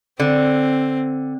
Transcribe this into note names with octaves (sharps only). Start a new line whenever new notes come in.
D3 C4